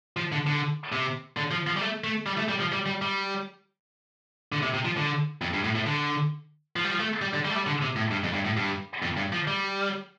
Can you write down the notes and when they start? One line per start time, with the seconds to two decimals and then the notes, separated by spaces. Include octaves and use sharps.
0.17 F3
0.32 D3
0.47 D3
0.92 C3
1.37 D3
1.51 F3
1.67 F3
1.76 G3
1.81 A3
2.04 A3
2.26 G3
2.38 A3
2.49 G3
2.60 F3
2.72 G3
2.86 G3
3.02 G3
4.52 D3
4.63 C3
4.74 C3
4.85 F3
4.97 D3
5.41 F2
5.54 G2
5.64 A2
5.76 A2
5.86 D3
6.76 F3
6.84 G3
6.91 F3
7.00 A3
7.22 G3
7.34 D3
7.45 G3
7.50 A3
7.56 G3
7.67 D3
7.82 C3
7.96 A2
8.11 G2
8.24 F2
8.34 G2
8.45 A2
8.57 G2
9.02 F2
9.17 G2
9.32 F3
9.47 G3